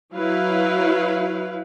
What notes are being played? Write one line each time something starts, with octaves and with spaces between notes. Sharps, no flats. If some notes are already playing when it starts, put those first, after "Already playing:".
F#3 E4 B4 F5